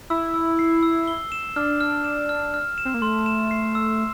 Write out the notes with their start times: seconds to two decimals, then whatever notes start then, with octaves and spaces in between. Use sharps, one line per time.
0.10 E4 E6
0.34 E6
0.59 C7
0.83 E6
1.07 G7
1.32 E7
1.56 D4 F6
1.81 F6
2.04 E7
2.29 F6
2.54 F6
2.78 E7
2.85 C4
2.94 A#3
3.02 A3 C6
3.26 E7
3.51 C7
3.75 E6